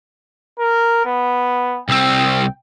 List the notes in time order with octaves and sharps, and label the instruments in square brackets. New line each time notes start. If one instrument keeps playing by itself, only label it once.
[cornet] A#4
B3
[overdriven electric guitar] C2 C4 [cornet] G5